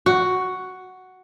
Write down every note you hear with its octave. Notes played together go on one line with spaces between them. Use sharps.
F#4